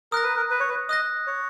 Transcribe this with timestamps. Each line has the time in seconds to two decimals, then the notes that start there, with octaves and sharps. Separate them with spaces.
0.12 A#4 D#6 F#6 A#6
0.23 B4
0.37 A#4
0.51 B4
0.60 C#5
0.69 B4
0.89 D#5 D#6 F#6 A#6
1.27 C#5